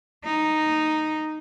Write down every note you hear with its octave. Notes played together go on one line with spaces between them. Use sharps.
D#4